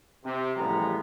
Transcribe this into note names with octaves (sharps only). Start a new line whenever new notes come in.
C3
A1 F3 G3 G#3 B3 A#5